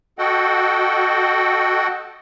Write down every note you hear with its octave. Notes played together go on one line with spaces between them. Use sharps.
F#4 A4 D#5 F#5 G5